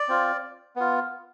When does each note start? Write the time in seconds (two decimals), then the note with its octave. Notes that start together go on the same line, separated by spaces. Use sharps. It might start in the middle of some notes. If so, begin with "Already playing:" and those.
Already playing: D5
0.08 C4 F4
0.76 B3 F4